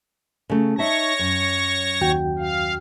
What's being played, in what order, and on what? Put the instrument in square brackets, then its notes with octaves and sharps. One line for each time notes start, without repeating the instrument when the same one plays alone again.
[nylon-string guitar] C#3 A3
[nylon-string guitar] D#4 E5 A5 [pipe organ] C#5 C#6 A#6
[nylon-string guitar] F#2
[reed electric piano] D#2 F#4 G5
[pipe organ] F5